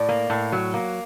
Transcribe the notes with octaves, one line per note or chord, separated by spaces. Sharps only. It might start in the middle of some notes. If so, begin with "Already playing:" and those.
Already playing: A2 D5
A#3
A2
F#3
A#3